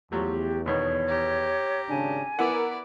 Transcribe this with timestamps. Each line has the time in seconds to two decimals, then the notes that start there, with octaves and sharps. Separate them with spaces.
0.12 E2 F3 F#3 A3 G4
0.66 D#2 B2 D#3 C#5
1.08 G4 A#5
1.89 G#1 C#3 D4 G#5
2.39 B3 E4 A#4 B4 D5 F#5